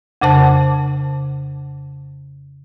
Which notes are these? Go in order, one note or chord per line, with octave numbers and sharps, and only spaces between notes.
F2 C#3 C5 A5